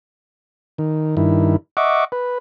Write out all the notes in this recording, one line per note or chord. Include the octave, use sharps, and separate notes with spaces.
D#3
G2 D#3 E4
D#5 E5 F#5 C#6 D6
B4